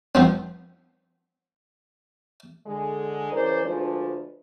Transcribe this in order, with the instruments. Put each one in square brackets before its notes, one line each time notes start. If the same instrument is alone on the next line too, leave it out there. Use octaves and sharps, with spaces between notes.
[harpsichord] F3 B3 C4
[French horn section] D3 G#3
C#3 E3 A#4 C5 D5
D2 F3 G#3 D4 B4